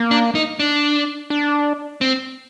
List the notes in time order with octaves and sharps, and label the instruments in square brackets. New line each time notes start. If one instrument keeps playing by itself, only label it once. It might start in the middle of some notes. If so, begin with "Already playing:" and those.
Already playing: [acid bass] A#3
[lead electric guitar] D4
D#4
D4
[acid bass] D4
[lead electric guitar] C4